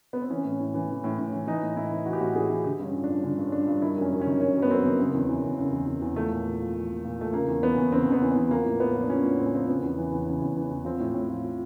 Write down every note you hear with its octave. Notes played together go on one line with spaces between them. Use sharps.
B3
C4
E3 C#4
A2
A2
E3
E3
A2
A2
E3
E3 D#4
A2
A2 E4
E3
E3 F#4
G4
A2 F#4
A2 G#4
E3
D3 G4
G2 C#4
F3
D4
G2
D3 C#4
G2
F3 D4
G2
D#3 E4
F#2
C#4
F#2
C#4
D#3
D#3 C#4
F#2
B3
F#2 C4
D#3
C#3
E2
E3
E2
C#3
E2
E3
E2
F3 A3
A#2
A#2
F3
F3
A#2
A#2
F3 A3
C#3 A#3
E2
E3 B3
E2
C#3 C4
E2 B3
E3
B3
E2
F3 A#3
A2
A2 B3
F3
D4
F3 C#4
A2
A2 C4
C#4
F3 C4
C#3 B3
E2
E3
E2
C#3
E2
E3
E2
F3 C4
A2
A2
F3
F3